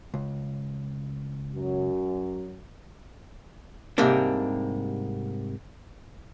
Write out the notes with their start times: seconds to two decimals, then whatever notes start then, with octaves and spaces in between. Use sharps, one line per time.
0.14 C#2
1.55 F#2 F#3
3.98 G#2 C3 G3 A#3 D4